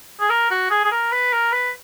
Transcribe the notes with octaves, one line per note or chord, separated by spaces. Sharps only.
G#4
A#4
F#4
G#4
G#4
A#4
B4
A#4
B4